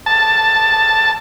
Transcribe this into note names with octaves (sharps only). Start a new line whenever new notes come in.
A5